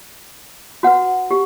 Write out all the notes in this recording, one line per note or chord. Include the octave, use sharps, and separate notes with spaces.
F#4 B4 F#5
G4